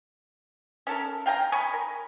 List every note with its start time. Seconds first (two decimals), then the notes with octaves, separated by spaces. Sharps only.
0.87 C#4 A4 A#4
1.26 F5 G5 G#5 A#5
1.52 C#5 G#5 B5 C#6
1.74 A#4